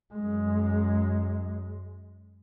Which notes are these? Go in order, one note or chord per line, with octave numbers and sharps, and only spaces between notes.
F#2 G#3